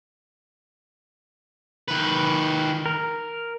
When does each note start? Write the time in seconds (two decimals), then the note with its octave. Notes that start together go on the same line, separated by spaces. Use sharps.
1.88 D#3 B4
2.86 A#4